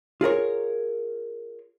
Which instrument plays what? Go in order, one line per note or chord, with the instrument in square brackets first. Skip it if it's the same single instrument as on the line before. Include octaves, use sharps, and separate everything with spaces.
[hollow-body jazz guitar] F4 G#4 A#4 C#5